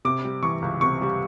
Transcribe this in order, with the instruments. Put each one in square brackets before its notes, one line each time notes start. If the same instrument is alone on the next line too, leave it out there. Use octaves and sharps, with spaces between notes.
[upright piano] C3 D6
G3
E3 C#6
C#2
C3 C#6
G3